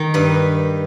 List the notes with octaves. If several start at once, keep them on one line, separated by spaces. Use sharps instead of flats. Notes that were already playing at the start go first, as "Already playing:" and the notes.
Already playing: D#3
G2 B4